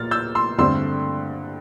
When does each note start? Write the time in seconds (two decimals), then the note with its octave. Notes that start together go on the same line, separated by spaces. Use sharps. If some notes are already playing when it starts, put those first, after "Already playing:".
Already playing: A#2 A#3 F6 A6
0.11 E6 G6
0.35 C6 E6
0.58 G2 D3 A3 C4 C6 E6